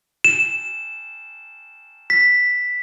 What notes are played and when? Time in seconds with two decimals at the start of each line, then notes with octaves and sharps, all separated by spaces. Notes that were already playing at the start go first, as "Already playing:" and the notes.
0.24 E7
2.10 B6